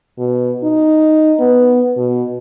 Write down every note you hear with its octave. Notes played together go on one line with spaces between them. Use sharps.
B2
D#4
B3
B2